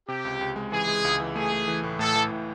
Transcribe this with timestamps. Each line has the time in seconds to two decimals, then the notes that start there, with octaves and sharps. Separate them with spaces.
0.08 C3 G4
0.25 C#2
0.41 C#2
0.56 G#3
0.72 E3 G#4
0.88 G#3
1.05 C#2
1.20 E3
1.35 A3 G#4
1.52 A3
1.68 E3
1.83 A2
1.99 A2 A4
2.15 E3
2.31 A2